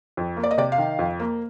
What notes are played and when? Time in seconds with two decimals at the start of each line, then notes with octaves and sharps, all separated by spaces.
0.17 F2
0.37 A#3
0.44 D5
0.51 D#5
0.58 C3 D5
0.72 F5
0.78 D#3
0.99 F2
1.20 A#3